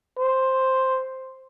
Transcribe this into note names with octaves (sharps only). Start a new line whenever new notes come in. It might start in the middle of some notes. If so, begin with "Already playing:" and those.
C5